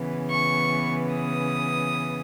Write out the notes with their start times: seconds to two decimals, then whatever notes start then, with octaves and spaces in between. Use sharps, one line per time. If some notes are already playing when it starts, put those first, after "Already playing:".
Already playing: C#3 E3 B3
0.30 C#6
1.14 D#6